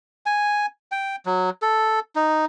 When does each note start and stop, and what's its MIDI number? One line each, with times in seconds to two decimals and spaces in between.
0.26 0.66 80
0.92 1.16 79
1.26 1.50 54
1.62 2.00 69
2.16 2.45 63